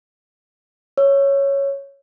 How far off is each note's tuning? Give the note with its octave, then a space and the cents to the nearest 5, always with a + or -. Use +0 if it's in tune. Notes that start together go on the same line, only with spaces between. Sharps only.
C#5 +0 E6 +30